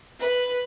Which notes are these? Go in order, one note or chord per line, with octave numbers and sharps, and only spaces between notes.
B4